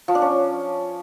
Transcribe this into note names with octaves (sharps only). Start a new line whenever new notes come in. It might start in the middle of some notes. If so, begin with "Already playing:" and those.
F3
D4
C#4